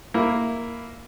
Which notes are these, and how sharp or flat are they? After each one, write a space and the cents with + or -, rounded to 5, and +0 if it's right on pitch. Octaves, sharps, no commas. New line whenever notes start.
A#3 +0 E4 +0